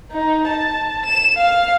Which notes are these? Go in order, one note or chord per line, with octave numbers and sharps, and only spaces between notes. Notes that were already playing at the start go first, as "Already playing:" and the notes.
D#4
A5
E7
F5